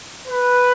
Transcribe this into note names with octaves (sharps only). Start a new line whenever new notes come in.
B4